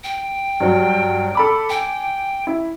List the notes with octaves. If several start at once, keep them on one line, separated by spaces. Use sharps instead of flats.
G5
G2 F#3
A4 B5 D6
G5 G#5
E4